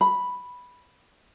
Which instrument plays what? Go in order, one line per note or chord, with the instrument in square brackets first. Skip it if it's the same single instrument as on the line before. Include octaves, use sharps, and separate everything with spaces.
[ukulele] B5